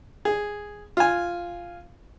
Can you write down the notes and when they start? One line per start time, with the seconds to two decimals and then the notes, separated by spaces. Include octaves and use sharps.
0.25 G#4
0.97 F4 G#5